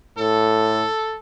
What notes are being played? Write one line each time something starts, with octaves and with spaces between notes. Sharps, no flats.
A2 A4